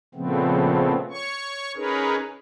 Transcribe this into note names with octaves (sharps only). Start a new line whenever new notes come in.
A#2 C#3 F3 A3 B3 C4
C#5 C#6
C#4 D#4 G#4 A#4 B4 C#5